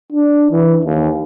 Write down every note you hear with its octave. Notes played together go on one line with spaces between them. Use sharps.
D4
E3
D#2